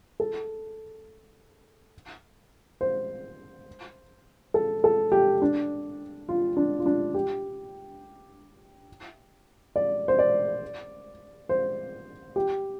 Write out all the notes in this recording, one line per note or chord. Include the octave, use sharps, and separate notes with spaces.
A4
C5
A4
A4
G4
D4
F4
D4
F4
D4
G4
D5
C5
D5
C5
G4